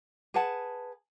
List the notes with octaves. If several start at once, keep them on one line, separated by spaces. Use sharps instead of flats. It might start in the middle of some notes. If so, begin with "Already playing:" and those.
G#4 B4 F#5 A5